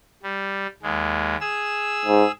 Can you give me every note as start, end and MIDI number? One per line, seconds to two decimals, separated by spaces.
0.23 0.67 55
0.83 1.36 39
0.83 1.36 56
1.41 2.32 68
1.41 2.32 88
2.06 2.25 44